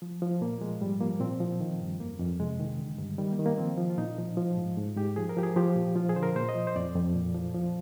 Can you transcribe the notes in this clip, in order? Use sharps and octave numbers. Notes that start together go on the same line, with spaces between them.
F3
F3
A#2 A#3
F3 G#3
G#2 G3
F3 A#3
A#2 C4
F3
D#3
G2
F2 A#3
F2
C3 G#3
D#3
D3
G2
D#3 G3
A#3
D#3
A#3
F3 C4
F3
F4
A#2 D#4
F3
F3
G#2
G#2
G#2 G4
F3 G#4
A#4
F3 G4
G#4
F3 G4
A#2
F3 F4
G#4
D3 C5
A#4
A#2 C5
D#5
F3
C5
F2 D5
F2
A#2
F3
F3